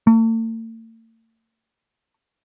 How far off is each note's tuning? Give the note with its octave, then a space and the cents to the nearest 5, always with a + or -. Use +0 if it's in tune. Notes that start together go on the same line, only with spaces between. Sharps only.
A3 +45